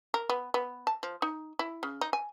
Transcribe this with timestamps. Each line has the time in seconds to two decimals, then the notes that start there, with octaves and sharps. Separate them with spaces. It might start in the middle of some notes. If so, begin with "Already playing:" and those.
0.14 A#4
0.29 B3
0.54 B3
0.87 A5
1.03 F3
1.22 D#4
1.59 E4
1.83 C#3
2.01 D#4
2.13 G#5